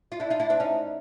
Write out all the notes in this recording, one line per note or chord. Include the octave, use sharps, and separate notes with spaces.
F4
D4 E4
D#4 F4
D4 E4
C4 D4
C#4 D#4